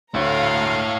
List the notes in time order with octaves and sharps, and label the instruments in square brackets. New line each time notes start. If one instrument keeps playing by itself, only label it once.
[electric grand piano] D2 [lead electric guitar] E4 C#5 [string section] F5 A#5